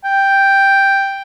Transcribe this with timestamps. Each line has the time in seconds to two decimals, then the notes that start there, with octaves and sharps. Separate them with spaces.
0.05 G5